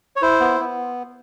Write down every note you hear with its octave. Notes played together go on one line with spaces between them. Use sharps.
C#5
E4 C5
B3
B3